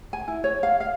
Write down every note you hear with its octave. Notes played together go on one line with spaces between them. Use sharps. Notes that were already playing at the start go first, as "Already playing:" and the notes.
G#5
E4
C#5
F5
F5